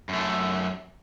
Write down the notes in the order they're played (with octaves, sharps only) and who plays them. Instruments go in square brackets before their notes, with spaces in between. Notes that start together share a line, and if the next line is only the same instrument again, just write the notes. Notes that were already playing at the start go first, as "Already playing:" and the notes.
[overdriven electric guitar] F#2 A3